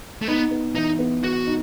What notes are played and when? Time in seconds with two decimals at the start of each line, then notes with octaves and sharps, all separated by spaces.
0.22 A3
0.28 B3 D#4
0.51 B3
0.75 E3 D#4
0.99 B3
1.23 B3 F#4
1.47 D#4